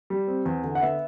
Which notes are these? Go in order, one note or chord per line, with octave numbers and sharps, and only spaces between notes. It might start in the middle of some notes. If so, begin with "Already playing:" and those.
G3
C4
E2
D3
F#5
B3 E5